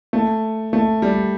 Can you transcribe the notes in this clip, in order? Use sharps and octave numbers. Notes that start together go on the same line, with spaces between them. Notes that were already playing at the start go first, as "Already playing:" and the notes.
A3
A3
G3